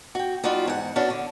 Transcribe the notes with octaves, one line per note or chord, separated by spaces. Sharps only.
F#4 G5
G3 D#4 F4 F#4
E2 G#2 F#5
B3 C#4 D4 E4 F#4
D3